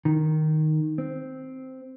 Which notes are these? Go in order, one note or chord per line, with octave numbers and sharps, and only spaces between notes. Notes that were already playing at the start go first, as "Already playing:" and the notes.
D#3
C4